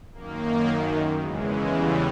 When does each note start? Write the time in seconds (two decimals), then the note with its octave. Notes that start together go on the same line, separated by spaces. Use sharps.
0.14 F#2 D#3 A#3
1.19 E2 C#3 E3 G#3
1.72 G3